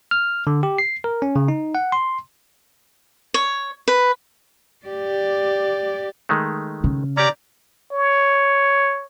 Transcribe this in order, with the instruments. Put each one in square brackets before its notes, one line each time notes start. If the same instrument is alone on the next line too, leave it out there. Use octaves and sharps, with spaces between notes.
[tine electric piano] F6
D3
G4
C7
A#4
C#4
C#3
D#4
F#5
C6
[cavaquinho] C#5
B4
[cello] G4 D5
[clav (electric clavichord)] D#3 G#3 A3
[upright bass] C#3
[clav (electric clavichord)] C#4 G4 [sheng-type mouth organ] D5 A#5
[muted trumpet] C#5